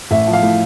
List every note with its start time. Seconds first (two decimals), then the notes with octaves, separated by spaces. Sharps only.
0.11 A1 E5
0.28 F3
0.33 F5
0.43 A2